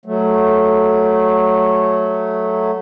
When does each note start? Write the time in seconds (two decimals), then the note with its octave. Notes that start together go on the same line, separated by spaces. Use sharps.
0.06 F#3 A3